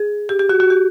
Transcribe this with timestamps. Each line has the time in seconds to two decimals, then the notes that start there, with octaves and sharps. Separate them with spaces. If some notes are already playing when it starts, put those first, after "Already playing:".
Already playing: G#4
0.29 G4
0.39 G4
0.49 F#4
0.60 F#4
0.70 G4